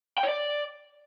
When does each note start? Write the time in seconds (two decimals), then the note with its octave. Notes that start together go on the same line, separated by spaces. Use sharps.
0.18 G5
0.23 C#5
0.29 D5